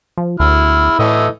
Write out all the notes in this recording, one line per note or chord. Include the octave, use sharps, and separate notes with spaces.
F3
D2 E4 F6
A2 E3 A3 D#5